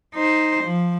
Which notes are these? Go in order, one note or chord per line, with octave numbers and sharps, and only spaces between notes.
D#4 C5
F3